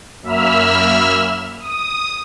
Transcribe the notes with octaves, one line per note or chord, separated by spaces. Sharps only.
F#2 A#3 E5 B5 E6 F6
D#6